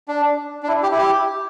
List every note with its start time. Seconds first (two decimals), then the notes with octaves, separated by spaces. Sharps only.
0.08 D4
0.63 D4
0.68 E4
0.83 G4
0.92 E4
0.98 G4